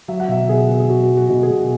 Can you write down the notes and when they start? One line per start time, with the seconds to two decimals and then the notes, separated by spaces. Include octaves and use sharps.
0.08 F#3 E5
0.20 F#5
0.28 B2 E5
0.49 B2 G#4
0.70 B2
0.80 G#4
0.89 F#3 F#4
1.10 F#3
1.17 F#4
1.29 B2
1.43 G#4
1.51 B2